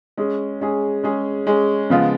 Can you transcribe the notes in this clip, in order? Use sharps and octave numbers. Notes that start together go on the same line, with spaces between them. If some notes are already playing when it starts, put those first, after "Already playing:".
G#3 C#4 G#4
G#3 C#4 G#4
G#3 C#4 G#4
G#3 C#4 G#4
C#3 F3 G#3 B3 F4